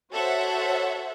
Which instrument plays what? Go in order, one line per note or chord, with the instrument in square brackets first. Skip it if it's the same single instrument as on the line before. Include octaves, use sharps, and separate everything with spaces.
[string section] F#4 A4 C5 C#5 E5 F#5